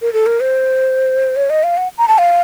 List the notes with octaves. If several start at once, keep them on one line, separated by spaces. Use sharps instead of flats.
A#4
A4
A#4
C5
C#5
D#5
F5
F#5
A#5
A5
F5